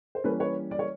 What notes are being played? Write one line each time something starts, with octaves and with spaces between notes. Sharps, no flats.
C5
E3 G3 A#3 C#4 A4 B4
B4 C#5
D5
C#5